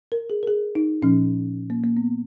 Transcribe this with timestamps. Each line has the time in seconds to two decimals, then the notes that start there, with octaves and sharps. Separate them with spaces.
0.12 A#4
0.30 G#4
0.43 A#4
0.48 G#4
0.75 D#4
1.02 A#2 F3 C#4
1.70 A#3
1.84 A#3
1.97 B3